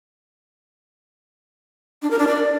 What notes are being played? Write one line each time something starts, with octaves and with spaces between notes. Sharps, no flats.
D4
A#4
D4
D5